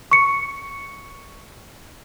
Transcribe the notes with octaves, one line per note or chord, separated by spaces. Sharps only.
C#6 C#7